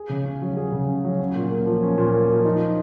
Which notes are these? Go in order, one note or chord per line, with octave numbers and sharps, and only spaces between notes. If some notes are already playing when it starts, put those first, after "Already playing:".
Already playing: G#4
C#3
C#4
F#3
G#4
C#3
C#4
F#3
C#4
A#2
A#3
F3
C#4
A#2
A#3
F3
D#4